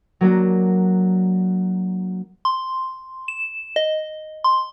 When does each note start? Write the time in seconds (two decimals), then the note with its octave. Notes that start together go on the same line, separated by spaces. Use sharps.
0.21 F#3 A#3 D4 F#4
2.45 C6
3.28 E7
3.76 D#5
4.44 C6